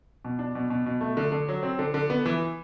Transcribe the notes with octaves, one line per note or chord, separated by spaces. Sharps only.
B2
D4
B2
B2
B2
A3
D3
D3
F#3
C4
D3
D3
B3
E3